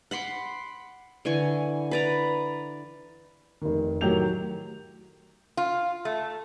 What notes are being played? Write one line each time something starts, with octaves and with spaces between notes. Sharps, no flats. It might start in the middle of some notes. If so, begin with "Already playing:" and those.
F#5 B5 C6 D6
D3 E3 G#5 C#6
B4 D5 A#5
F1 D#3
A2 D#3 F#3 G4 G6 F7
F4
A3